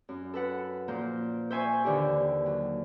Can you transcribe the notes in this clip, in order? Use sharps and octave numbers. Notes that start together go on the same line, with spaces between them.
F#2
A4 B4 F#5
A#2 F3 A#3 C5
C5 E5 G#5 C#6
D#2 D3 E3 G4
F#3